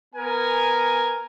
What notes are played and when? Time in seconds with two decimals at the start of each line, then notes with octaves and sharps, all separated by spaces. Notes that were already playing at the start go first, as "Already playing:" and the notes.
0.15 B3 A#4 G#5